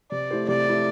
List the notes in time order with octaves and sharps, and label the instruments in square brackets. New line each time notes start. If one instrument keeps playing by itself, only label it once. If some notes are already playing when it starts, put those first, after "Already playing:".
[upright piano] C3 [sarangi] D5
[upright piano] A3 E4 G4 C5
[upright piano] C3 [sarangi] D5
[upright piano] A3 E4 G4 C5